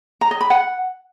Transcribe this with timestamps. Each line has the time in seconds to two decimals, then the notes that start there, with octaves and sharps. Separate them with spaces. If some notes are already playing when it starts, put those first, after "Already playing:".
0.21 A#5
0.31 D#5
0.41 B5
0.50 F#5